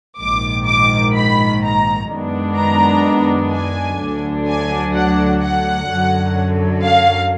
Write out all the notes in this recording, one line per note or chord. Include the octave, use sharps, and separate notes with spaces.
A#1 G#2 D#3 D6
D6
B5
A#5
F#2 D#3 G#3 B3 D4
A#5
G#5
D2 D3 F#3 D4
G#5
F#5
F#5
F#2 D3 F#3
F5